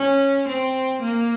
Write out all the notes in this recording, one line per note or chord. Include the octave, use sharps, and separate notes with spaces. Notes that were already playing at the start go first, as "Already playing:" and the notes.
Already playing: C#4
C4
A#3